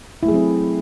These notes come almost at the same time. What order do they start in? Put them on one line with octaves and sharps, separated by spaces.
E4 A3 G#4 F#3 C4